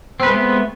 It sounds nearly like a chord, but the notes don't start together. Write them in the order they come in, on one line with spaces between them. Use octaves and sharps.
C4 B4 G#3 A3 B3